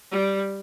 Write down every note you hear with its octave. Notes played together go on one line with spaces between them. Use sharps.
G3